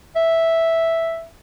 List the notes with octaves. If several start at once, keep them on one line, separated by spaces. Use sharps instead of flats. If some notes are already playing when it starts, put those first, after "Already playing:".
E5